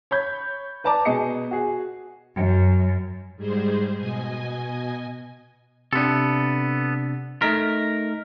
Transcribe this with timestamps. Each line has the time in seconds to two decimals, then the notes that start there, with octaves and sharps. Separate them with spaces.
0.11 C#5 B5 G6 G#6
0.84 B4 D5 A5 A#5 D6
1.05 B2 B3 G#4 D#5 C#7
1.51 F#4 G#4
2.35 F#2
3.36 G#2 G3 G#3 G#4 C5
3.97 B2 D#5 G#5
5.93 C3 B3 D4 A4
7.42 A3 D#4 A#4 B6